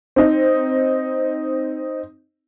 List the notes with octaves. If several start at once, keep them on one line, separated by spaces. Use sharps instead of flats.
C4 D#4